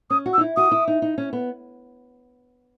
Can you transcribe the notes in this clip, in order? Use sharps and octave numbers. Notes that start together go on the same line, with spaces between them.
C#4 D#6
F#4
E6
D#4
E4
F#4 D#6
E4
D#4
D#4
C#4
B3